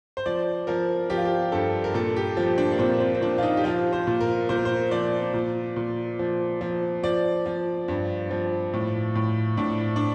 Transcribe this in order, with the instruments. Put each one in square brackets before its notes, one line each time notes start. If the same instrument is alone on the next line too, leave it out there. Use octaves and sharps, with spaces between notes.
[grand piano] C5
F3 D5
F3 A#4
F3 G4
F4
G4
G2 A4
A#4
A#2 A4
G4
F3
D4
A#3
A#2 C4
C4
C4
A#2 D4
F4
D#4
G4
F3 F4
C5
A#2
A#4
A#2 C5
A#4
C5
F3 D5
A#2
A#2
F3
F3
F3 D5
F3
G2
F3
A2
A2
A2 D4
D4